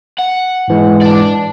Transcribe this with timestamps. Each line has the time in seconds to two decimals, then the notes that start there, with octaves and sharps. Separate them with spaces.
0.19 F#5
0.68 G#2 E3 G#3
1.01 D5 A5